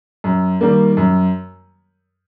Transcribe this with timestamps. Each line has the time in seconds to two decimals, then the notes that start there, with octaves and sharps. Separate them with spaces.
0.24 F#2
0.61 D#3 G3 A#3
0.97 F#2